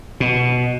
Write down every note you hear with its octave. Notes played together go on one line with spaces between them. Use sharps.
B2